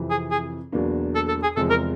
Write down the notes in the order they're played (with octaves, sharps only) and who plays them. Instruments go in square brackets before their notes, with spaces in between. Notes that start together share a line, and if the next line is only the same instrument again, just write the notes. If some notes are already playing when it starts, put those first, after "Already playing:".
Already playing: [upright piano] F2 C3 E3
[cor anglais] G#4
G#4
[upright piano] E2 B2 F#3 A#3 D4
[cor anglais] A4
A4
G#4
[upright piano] E2 C3 F3 G#3 [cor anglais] A4
[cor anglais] A#4